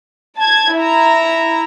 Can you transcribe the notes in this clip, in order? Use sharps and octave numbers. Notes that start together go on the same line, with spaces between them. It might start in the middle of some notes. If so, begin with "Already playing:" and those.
A5 G#6
E4 A#5